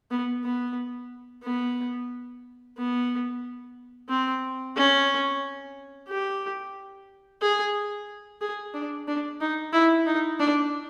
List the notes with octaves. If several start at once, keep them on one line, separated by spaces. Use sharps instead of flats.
B3
B3
B3
B3
C4
C#4
G4
G#4
G#4
D4
D4
D#4
E4
D#4
D4